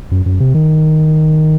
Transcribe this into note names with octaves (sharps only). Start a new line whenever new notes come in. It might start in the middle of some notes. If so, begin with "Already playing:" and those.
F#2
F#2
C3
D#3